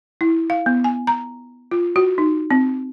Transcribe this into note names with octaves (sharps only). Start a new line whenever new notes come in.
E4
F5
B3
G#5
A#5
F4
F#4
D#4
C4